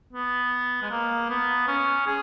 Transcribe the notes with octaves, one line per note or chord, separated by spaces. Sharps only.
B3
G#3
A#3
B3
C#4
G#4